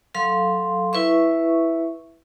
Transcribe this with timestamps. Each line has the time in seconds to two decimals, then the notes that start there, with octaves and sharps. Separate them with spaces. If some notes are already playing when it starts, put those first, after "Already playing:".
0.15 F#3 A4 F5 C6
0.93 E4 B4 E5 C#6